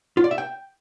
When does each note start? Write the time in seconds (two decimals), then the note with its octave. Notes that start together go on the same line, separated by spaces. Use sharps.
0.17 F4
0.24 D5
0.31 E5
0.38 G5